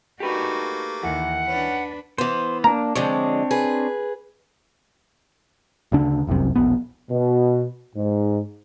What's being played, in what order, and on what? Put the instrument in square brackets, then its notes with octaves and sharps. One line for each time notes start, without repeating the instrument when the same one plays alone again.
[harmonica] A3 A#3 [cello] D#4 F#4 [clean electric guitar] G4 B4
[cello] D#2 D#3 [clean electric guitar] E3 [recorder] F#5
[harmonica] C#4 [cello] D4 B4
[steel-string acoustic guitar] E3 B3 [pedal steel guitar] C5
[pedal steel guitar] A#3 D4 [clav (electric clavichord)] A#5
[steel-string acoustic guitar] D3 F3 G#3 [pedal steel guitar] C4 D4 C#5
[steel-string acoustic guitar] G#4 B4
[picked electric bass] D2 C#3 D4
F1 C2 F#2 C3
E1 A#1 B3
[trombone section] B2
G#2